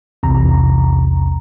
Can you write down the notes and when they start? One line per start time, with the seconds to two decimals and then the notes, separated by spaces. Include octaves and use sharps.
0.23 B1 E2 C3 A#5